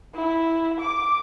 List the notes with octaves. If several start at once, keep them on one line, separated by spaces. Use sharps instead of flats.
E4
D6